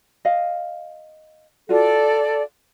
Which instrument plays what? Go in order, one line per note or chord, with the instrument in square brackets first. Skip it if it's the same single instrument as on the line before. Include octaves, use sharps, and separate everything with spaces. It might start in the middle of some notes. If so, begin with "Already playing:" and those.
[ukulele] D#5 F5
[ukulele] F4 F#4 [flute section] A4 D5